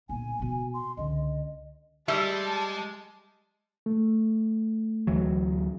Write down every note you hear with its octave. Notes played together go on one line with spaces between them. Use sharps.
B1 A#2 G#5
B2 B3
C6
C#2 D3 D#5
G3 G#3 E5 A5
A3
D2 E3 F#3